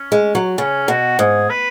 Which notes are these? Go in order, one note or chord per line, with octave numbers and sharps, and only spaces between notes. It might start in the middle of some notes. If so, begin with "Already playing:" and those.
Already playing: C#4
G#3
F#3
C#3 C#4
B2 F#4
G#2 G#4
B4